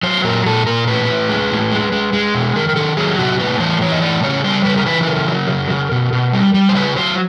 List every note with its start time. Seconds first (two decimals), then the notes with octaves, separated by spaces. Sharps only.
0.03 F#3 C5
0.24 A#2 A#4
0.46 A#2 A4
0.67 A#2 A#4
0.87 A2 B4
1.09 A2
1.29 G#3
1.51 A2
1.71 G#3
1.92 G#3
2.13 G#3
2.35 B2
2.56 D#3 A#4
2.69 A#4
2.76 D#3 A4
2.97 F#3 G#4
3.19 C3 F#4
3.39 A2 B4
3.60 E3 C5
3.81 E3 C#5
3.92 D#5
4.02 A2 D5
4.23 C#3 C#5
4.44 G3 C5
4.65 C#3 B4
4.77 A#4
4.86 E3 B4
5.03 B4
5.07 C#3 A#4
5.28 F#3
5.49 C#3
5.70 C#3
5.92 B2
6.13 B2
6.33 G3
6.54 G3
6.69 C5
6.75 C#3 B4
6.96 F#3 C5